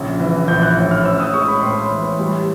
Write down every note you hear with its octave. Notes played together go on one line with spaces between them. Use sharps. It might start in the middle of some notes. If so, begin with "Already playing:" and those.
Already playing: A#1 C#3
E3
A#1 G6
F#6
A2
F6
C#4 E6
D#6
G#3 C#6
B5
A2 C6
E3
G3